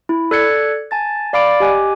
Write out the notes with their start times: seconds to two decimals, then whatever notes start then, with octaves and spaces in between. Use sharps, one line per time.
0.09 E4
0.31 A4 D5 F#6 G#6 C#7
0.91 G#5 A5 A6
1.33 D5 F5 B5 D6 D7
1.60 G4 D#5 G#5 D6 F#6